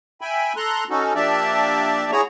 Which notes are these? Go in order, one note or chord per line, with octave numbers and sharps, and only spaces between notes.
E5 G5 G#5 B5
A4 A#5 C6 F#6
C#4 D#4 F#4 A4
F3 A#3 D4 G4 D5 E5
E4 F#4 G#4 C#5 A#5